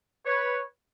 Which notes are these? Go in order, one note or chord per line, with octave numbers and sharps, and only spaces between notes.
B4 C#5